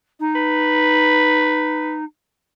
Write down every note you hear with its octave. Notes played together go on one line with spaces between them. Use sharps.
D#4
B4